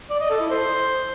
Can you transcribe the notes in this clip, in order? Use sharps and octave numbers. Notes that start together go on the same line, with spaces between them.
D5
D#5
A4
E4
C5